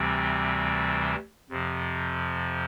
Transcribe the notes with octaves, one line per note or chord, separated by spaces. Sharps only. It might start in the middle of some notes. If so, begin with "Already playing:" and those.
Already playing: D2 C3 E3 G3 C4
F2 C3 F3